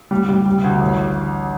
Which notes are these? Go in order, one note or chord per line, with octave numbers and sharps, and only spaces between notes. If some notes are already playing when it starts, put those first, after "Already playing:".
G3
G3
G3
D2
A1